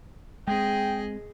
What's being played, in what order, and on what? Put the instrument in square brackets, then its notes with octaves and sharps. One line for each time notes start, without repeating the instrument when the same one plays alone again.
[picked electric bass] G#3 C4 [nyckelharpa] G#4 D#5 [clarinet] G5